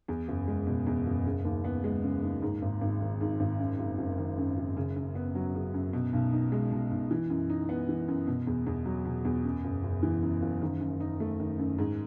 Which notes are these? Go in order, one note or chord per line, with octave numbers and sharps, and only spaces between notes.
E2
F#1
G#3
B2
E2
F#1
C#3
D#2
B3
G#3
C#3
D#2
G#2
G#1
G#1
D#3
G#2
G#1
F#2
F#1
F#1
D#3
F#2
F#1
C#3
F#2
B3
F#3
C#3
F#2
B2
B1
D#4
G#3
B2
B1
E3
F#2
D#4
B3
E3
F#2
B2
E2
E2
F#3
B2
E2
F#2
F#1
F#1
E3
F#2
F#1
D#3
F#2
D#4
A3
D#3
F#2
G#2